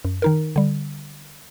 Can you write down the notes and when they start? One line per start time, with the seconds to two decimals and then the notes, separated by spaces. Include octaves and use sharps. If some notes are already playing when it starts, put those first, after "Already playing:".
0.05 F#2
0.22 D#3 D#4 A#4
0.56 D3 G3